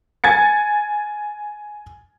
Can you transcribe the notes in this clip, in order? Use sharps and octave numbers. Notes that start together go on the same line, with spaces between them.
G#5 G#6 A6 C#7